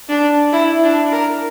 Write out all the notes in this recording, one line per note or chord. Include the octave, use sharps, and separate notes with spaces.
D4
E4
D4
A#4